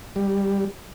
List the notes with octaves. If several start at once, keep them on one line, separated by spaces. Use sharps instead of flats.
G3